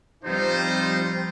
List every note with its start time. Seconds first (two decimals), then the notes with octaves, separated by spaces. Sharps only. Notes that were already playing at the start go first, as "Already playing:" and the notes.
0.24 F3 G3 C4 D#4 F4 C5